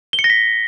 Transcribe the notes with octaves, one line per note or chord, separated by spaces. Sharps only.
G7
C#7
A#6
B6